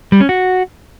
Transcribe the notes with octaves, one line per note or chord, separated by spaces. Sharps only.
G3
C#4
F#4